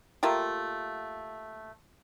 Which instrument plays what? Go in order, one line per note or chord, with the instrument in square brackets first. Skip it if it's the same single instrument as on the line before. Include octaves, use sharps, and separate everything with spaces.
[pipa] A3 A#3 F4 G4